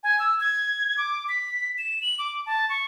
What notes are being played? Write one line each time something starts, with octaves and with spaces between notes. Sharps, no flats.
G#5
E6
G#6
D6
B6
E7
F#7
D6
A5
C#6